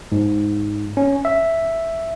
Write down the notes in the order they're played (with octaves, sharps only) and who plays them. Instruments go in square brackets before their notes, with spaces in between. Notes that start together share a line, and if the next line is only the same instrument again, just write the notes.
[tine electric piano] G#2
C#4
E5